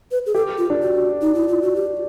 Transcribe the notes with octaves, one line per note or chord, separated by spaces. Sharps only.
B4
G#4
G4 A4
F4
D4
F#4
D#4
E4
F4
F#4
G4